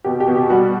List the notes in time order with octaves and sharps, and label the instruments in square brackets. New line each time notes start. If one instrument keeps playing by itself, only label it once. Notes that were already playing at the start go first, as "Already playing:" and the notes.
[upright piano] B2 G4
G4
B2
G4
G3 F#4